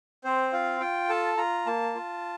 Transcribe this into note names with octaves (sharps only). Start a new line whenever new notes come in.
C4 C5
F4 F5
F4 G5
A4 A5
F4 A#5
A#3 A5
F4